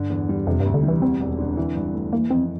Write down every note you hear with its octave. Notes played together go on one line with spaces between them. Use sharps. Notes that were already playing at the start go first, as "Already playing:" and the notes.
Already playing: G2 D3
E2
G3
F2 C3
G2
D2
D3
G3
E3
E2 C4
E1
D3
E3
G2
A3
E3 A#3
F2 C4